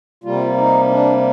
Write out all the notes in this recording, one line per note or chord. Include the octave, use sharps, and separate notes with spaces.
C3 G3 A#3 F4
D#4
D4